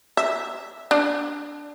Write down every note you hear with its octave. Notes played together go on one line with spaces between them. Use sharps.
E5
D4